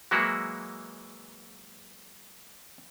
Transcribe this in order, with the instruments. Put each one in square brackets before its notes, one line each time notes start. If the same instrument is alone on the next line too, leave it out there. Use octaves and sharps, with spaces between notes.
[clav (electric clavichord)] E3 F#3 G#3 A#3 E4 F#4